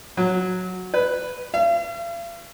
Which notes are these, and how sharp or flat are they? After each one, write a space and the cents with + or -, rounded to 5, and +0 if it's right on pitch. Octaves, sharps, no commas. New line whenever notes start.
F#3 -10
B4 +0
F5 -45